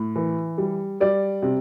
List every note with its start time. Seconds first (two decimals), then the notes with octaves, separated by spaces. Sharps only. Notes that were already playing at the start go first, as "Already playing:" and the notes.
Already playing: A2
0.16 E3
0.58 G3
1.00 G3 D5
1.42 C3